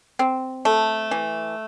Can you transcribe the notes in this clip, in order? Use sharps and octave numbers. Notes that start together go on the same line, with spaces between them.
C4
A3
E3